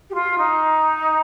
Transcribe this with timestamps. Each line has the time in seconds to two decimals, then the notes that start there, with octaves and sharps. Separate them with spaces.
0.10 G4
0.14 F4
0.38 D#4